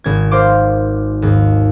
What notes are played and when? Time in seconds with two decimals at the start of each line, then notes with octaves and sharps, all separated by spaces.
0.04 G#1 G#6
0.31 A#4 C5 F5 C6 D6
1.22 D#2 G#2